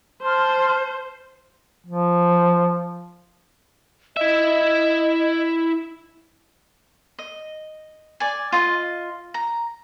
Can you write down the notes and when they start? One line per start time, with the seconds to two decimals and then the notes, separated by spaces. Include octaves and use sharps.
0.22 C5 A5 C6 F6
1.86 F3
4.17 E4 D#5 E5
7.19 D#5
8.20 D5 G#5
8.52 F4 D#5
9.34 A#5